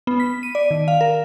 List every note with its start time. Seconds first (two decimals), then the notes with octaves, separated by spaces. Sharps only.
0.07 B3
0.20 B6
0.43 D#7
0.55 D5
0.71 D#3
0.88 F5
1.01 A#4